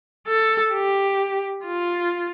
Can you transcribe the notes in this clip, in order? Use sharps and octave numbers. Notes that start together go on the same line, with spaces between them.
A4
G4
F4